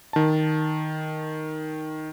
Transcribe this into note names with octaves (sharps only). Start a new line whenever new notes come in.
D#3 A5